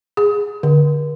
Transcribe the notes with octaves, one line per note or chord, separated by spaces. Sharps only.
G#4
D3